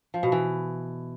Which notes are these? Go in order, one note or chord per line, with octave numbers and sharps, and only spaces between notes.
F3
B2
E3